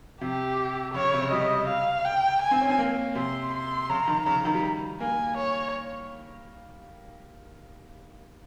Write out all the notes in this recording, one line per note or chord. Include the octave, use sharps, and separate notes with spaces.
C3 G4
C#3 C#5
C#3
C3
C#3
G3 D#5
F5
G5
G#5
C4
C#4
C4
A#3
C3 C6
C6
C#3 A#5
D#3
C#3 A#5
C#3
D#3
G3
A#3 G#5
C#5